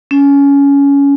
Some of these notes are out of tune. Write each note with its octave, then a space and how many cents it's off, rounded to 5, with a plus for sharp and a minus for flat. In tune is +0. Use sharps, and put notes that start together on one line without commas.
C#4 +20